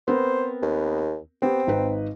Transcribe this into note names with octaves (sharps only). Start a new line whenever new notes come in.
B3 C4 A#4 C5
D#2
B3 C4 G4
G#1 D#4 B4